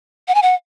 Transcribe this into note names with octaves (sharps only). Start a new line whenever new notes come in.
F#5
G#5
F#5